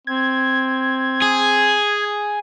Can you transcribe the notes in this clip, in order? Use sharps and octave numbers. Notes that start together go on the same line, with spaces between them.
C4 G#6
G#4